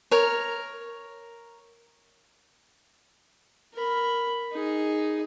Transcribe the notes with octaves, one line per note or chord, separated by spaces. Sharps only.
A#4 C#5
A#4 B5
D#4 G#4